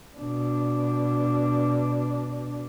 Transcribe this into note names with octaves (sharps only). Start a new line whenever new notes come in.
B2 D4